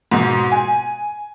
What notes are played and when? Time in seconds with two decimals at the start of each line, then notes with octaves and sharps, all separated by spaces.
0.12 G#2 B2
0.52 G#5